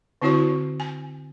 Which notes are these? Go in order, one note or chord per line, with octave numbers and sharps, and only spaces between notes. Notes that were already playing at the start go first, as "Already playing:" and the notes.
D3 C4 E4 F#4 C#5 C#6
G#5